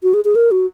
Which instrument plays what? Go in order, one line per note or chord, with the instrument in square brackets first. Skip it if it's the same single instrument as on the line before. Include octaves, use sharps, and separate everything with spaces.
[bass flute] F#4
G#4
G#4
A#4
F#4